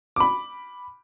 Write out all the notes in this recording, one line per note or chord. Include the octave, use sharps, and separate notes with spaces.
B5 D6